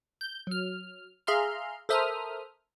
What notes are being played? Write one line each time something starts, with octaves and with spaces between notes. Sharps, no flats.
G6
F#3 F6
G#4 E5 F5 A#5 C6 F6
A4 A#4 C5 E5 D#6 F6